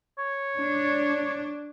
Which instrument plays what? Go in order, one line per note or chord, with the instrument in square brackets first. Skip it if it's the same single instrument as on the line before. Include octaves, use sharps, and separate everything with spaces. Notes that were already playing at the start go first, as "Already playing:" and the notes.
[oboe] C#5
[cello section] D4